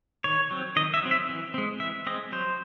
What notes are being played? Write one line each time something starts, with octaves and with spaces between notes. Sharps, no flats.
D#3 C#5
F#3 C4
D#3 D#5
E5
F#3 C4
E5
E3
G#3 C4
E3 E5
G#3 C4 D#5
F#3 C5